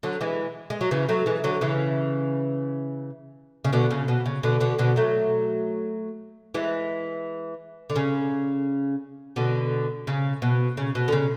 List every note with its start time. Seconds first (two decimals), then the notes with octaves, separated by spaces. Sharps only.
0.03 D3 F#3
0.21 E3 G#3
0.70 G#3
0.81 F#3
0.91 C#3 E3
1.08 F#3 A3
1.26 E3 G#3
1.44 D3 F#3
1.61 C#3 E3
3.64 C#3
3.73 B2 D3
3.91 C#3
4.08 B2
4.26 C#3
4.43 B2 D3
4.60 B2 D3
4.78 B2 D3
4.96 F#3 A3
6.54 E3 G#3
7.90 D3
7.96 C#3
9.36 B2 D3
10.07 C#3
10.42 B2
10.77 C#3
10.95 B2
11.08 D3
11.12 C#3